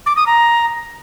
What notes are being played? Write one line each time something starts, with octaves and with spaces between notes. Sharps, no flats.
D6
D#6
A#5